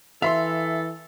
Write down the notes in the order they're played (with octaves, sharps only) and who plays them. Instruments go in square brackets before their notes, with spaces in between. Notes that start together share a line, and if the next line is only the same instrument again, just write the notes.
[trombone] E3 [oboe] A4 [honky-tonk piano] E5 [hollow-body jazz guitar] F5 B5 C6